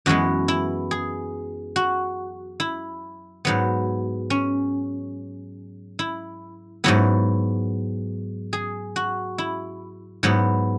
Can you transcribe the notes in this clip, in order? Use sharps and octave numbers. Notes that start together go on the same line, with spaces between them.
F#2 E3 G#3 B3 F#4
E4
G#4
F#4
E4
G#2 F#3 B3
C#4
E4
G#2 F#3 B3 E4
G#4
F#4
E4
G#2 F#3 B3 E4